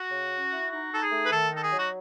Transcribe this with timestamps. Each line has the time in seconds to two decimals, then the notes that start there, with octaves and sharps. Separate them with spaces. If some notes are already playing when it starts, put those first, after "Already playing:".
Already playing: F#4
0.12 C#3
0.32 C#4
0.51 E4
0.71 D#4 F#4
0.92 D#4 A4
1.02 G#4
1.12 A3
1.24 B4
1.32 D#3 A4
1.52 D#4 A4
1.62 G#4
1.72 F#3
1.77 F#4